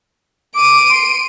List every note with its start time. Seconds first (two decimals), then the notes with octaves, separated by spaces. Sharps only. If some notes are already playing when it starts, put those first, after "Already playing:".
0.55 D6 D7 D#7
0.90 C6